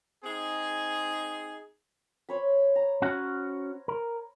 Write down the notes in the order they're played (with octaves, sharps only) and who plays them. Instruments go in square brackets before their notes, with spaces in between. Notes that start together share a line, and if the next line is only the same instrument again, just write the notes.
[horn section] C4 D#4 G#4
[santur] C5 C#5 B5
A#5
[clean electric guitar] C#4 F#4 F#5
A#4